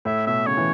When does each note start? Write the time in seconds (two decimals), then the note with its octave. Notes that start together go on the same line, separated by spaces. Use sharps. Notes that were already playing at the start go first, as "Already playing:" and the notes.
0.05 A2 E5
0.27 B2 E5
0.47 C#3 C#5
0.57 E3